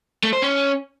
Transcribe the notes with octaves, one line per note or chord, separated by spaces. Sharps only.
A3
C5
C#4